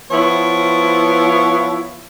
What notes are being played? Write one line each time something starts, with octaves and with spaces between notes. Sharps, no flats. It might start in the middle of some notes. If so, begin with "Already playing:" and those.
F3 B3 E4 C#5